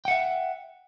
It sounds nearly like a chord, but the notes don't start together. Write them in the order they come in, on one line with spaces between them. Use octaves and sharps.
G5 F#5 E5